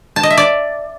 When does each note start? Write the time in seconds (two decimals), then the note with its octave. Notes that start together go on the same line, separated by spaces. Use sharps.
0.16 A5
0.23 D#5
0.30 E5
0.38 D5